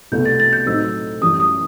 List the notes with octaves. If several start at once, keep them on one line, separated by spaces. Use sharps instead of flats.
C2 B2 A3 E4 G6
A6
A6
G6
A2 F#3 C4 D#4 E6
F#2 E3 G3 D#6
D#6